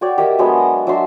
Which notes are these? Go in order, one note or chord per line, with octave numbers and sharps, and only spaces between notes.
F#4 C#5 D5 G5
G4 A#4 D#5 E5
F#3 G#3 B3 D4
A#5
F#3 D4 E5 C6